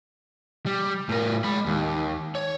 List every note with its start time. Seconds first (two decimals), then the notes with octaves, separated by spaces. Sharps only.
0.66 G3
1.09 A2 A#4
1.44 G#3 B5
1.66 D#2
2.35 C#5